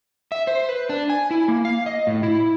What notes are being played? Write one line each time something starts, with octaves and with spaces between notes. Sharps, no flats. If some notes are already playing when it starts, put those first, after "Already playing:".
E5
C5
B4
D4
G#5
E4
A#3
F5
D#5
A2
E4